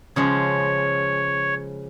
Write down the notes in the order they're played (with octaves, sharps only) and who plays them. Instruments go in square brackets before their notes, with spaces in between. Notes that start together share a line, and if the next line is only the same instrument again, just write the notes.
[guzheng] C#3 F3 G#3 [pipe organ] C#5